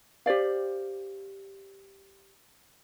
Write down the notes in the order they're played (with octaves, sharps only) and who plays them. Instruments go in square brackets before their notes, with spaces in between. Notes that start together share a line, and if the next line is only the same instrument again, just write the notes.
[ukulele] G4 C5 D5 F5